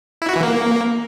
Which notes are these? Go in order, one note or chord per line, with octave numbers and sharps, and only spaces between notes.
E4
F#4
E3
A#3